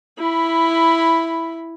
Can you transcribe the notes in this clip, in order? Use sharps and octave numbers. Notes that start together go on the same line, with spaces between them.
E4 B5